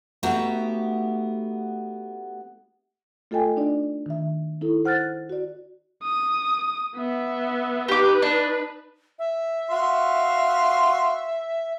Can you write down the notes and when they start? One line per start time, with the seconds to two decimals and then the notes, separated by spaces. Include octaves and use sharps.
0.23 A3 B3 D#4 F#4 G4
3.31 A3 F4 A4 D#5 G5 G#5
3.57 D4 D#4 D5
4.06 D#3 E5
4.61 D#4 E4 A4
4.85 C5 F#5 F6 F#6 A6
5.30 F#4 D5
6.04 D#6
6.96 B3 E5
7.88 D#4 G4 B4 D6
8.22 D4
9.19 E5
9.71 F#4 F5 C6